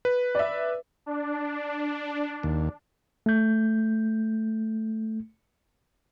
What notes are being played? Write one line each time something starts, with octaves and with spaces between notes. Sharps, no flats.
B4
D5 E5
D4
D#2
A3 G6